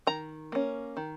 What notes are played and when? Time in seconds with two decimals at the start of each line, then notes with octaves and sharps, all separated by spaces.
0.07 D#3 A#5
0.52 A#3 C#4
0.97 D#3